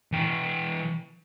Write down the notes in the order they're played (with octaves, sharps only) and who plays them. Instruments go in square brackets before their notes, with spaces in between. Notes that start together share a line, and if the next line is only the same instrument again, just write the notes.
[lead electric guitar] E3 G5